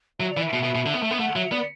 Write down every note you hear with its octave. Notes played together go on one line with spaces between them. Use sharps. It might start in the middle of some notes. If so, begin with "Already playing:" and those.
F#3 E5
D5
E3
E5
B2
B2
B2
D3
B3
A3
B3
A3 F#5
F#3 E5
B3 D5